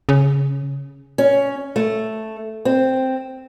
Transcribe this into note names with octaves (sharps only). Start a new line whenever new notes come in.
C#3
C#4
A3
C4